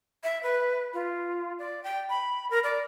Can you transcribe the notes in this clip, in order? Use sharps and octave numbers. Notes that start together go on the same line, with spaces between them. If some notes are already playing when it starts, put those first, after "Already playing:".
E5
B4
F4
D5
G5
B5
A#4
D5